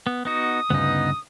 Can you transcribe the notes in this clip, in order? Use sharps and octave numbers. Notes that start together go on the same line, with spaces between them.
B3
B3 D#4 F#4 D#6
D2 G2 C#3 B3 D#4